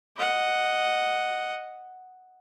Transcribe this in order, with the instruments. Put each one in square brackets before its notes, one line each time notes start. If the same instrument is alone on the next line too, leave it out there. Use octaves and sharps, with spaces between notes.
[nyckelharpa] D#5 F#5